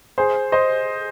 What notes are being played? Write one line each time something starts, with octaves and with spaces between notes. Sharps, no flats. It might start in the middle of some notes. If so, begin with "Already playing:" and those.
G#4 C5
C5 D#5